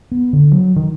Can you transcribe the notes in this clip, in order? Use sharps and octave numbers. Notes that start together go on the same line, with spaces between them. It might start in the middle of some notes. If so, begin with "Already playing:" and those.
B3
D3
F#3
D#3